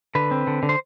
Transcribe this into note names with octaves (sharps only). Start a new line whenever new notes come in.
D3 B4
C4
D3
D3
C5